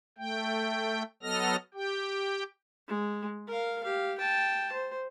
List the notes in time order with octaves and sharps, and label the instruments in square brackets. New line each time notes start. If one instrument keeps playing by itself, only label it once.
[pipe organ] A3 G5
F#3 B3 A4 D#5 F6 A#6
G4 G5
[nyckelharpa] G#3
A#4 F5
G4 F5
G5 A5
C5